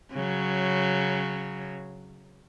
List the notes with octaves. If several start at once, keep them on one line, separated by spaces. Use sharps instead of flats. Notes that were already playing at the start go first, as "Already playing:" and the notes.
C#3 F#3